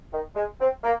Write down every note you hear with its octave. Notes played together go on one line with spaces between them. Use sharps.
D#3
G#3
C4
A#3